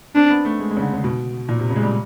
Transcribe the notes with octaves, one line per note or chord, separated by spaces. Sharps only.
C4 D4
B3
A3
G#3
G#3
C#3
D3
C#3
B2
A#2
C3
C#3
G#3
G3